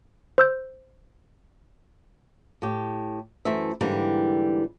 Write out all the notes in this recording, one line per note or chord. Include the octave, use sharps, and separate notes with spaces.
C5 E6 G6
A2 G4
F#2 E3 A3 C5 E5
G#2 D3 E3 G3 A#3